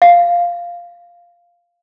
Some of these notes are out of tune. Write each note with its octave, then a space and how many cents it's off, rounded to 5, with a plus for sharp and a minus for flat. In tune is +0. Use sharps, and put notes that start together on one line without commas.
F5 -5